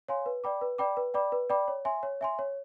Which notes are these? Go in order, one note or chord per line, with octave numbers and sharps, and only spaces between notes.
C#5 F5 G#5 C6
B4
D5 G5 B5 D6
B4
D5 G5 B5 D6
B4
D5 G5 B5 D6
B4
D5 G5 B5 D6
C#5
E5 G#5 C6
C#5
E5 G#5 C6
C#5